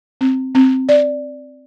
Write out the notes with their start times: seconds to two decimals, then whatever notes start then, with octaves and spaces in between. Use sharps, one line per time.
0.21 C4
0.55 C4
0.89 D5